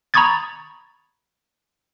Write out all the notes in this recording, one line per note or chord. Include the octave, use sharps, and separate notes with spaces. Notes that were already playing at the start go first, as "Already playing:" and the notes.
A#5 B5 C#6 D#6 G#6 A6